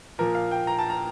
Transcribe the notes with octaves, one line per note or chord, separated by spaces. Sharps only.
A#2 F3 A#3 A#4
F5
G5
A#5
A5
A#5